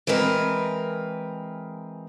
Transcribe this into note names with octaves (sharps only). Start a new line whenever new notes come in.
E3 G#3 C4 A#4 B4